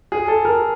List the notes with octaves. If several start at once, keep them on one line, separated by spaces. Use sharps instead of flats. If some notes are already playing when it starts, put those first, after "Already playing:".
G#4
A4
A#4